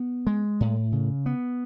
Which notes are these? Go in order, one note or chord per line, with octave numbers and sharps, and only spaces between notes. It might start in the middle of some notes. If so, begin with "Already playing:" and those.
Already playing: B3
G#3
A2
C#3
B3